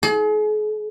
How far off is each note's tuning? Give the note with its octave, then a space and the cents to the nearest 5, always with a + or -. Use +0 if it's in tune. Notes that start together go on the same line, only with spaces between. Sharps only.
G#4 +40